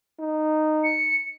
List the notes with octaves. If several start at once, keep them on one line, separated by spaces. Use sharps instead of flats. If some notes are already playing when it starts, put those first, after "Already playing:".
D#4
C#7